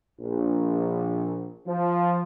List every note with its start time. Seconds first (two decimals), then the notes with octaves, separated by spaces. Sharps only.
0.21 A#1
1.67 F3